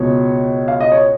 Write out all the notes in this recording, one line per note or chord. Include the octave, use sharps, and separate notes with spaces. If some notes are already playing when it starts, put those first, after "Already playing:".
Already playing: C#2 B2 C#5
F5
D#5
C#5